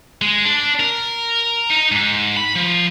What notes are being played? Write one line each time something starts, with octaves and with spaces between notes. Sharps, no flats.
G#3
D4
A#4
D#4
G#2
B5
F3